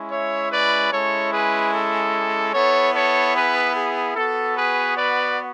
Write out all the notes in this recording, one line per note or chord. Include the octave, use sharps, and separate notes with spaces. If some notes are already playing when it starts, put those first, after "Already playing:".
Already playing: G#3 C#4 E4
C#5 E5
B4 D5
G#3 C#4 E4 A4 C#5
G#4 B4
A4
B3 E4 A4 C#5
A4 C#5
G#4 B4
G#4
B3 F#4 A4
G#4 B4
B4 D5